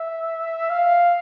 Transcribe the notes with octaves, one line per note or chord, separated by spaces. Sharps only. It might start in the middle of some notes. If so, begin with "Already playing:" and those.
Already playing: E5
F5